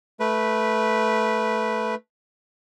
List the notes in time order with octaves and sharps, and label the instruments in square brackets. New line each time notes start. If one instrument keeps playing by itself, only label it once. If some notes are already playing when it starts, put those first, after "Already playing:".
[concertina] A3 B4